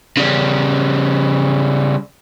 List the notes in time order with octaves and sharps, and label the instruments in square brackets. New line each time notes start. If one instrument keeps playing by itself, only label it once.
[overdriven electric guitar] C#3 G3